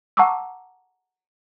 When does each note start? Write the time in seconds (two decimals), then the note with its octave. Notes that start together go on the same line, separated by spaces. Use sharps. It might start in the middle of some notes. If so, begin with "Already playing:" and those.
0.17 F#5 A5 A#5 C#6 D6 E6